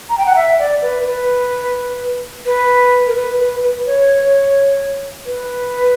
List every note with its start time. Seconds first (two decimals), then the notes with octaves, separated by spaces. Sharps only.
0.10 A#5
0.18 G5
0.26 F#5
0.36 E5
0.59 D5
0.82 B4
1.06 B4
2.46 B4
3.07 A#4
3.16 B4
3.39 B4
3.63 B4
3.86 C#5
5.26 B4